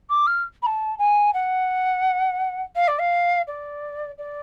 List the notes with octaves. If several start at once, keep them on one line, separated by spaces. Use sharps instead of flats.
D6
F6
B5
A5
G#5
F#5
F5
D5
F5
D5
D5